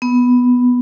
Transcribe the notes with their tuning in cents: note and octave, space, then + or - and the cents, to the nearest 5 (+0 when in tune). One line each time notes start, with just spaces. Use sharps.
B3 +0